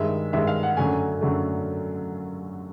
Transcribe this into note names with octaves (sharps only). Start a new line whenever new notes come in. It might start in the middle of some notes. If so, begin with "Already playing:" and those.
Already playing: G2 D#3 G#3 E5
G2 D#3 G#3 E5
F5
F#5
F#2 D3 F#3 A3 G#5
F#2 D3 F#3 A3